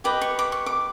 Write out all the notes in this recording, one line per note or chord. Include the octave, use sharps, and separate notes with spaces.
G4 B4 D#5 D6
C#6
D6
C#6
D6